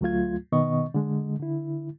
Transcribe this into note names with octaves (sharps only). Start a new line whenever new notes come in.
D2 F#3 A3 F4 G#6
B2 D#3 B3 D#5 C#6
D3 G#3
D3 E4